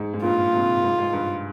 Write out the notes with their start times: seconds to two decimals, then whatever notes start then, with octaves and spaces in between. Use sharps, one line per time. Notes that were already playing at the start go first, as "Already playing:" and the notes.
Already playing: G#2
0.14 G#2
0.22 G2 A#2 F4
0.52 G#2 C3
0.84 G#2
0.98 G#2
1.13 G2